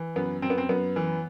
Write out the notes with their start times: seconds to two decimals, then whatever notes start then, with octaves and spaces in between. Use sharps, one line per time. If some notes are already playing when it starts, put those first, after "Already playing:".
Already playing: E3
0.16 F#2 B3
0.42 F#2 C4
0.50 B3
0.58 C4
0.69 F#2 B3
0.96 E3